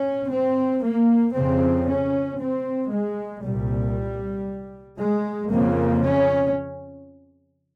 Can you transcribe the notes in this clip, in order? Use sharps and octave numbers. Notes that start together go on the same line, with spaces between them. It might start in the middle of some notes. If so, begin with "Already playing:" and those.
Already playing: C#4
C4
A#3
F2 C#3 C4
C#4
C4
G#3
C2 A#2 G3
G#3
F2 C#3 A#3
C#4